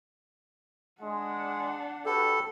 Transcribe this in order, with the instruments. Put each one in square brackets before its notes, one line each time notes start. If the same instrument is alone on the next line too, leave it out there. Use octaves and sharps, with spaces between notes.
[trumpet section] G#3 [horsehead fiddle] D4 F#5
[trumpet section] F#4 G4 B4 [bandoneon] A4